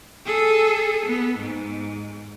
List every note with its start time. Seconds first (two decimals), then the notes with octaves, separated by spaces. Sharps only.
0.26 G#4 A4
1.05 B3
1.39 G#2